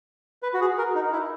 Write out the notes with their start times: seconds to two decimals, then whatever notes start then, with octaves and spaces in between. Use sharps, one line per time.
0.43 B4
0.54 F#4
0.61 G#4
0.78 A#4
0.95 D#4
1.12 E4